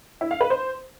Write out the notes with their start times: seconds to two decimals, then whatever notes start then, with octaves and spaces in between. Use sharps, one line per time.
0.21 E4
0.31 F5
0.41 B4
0.50 C5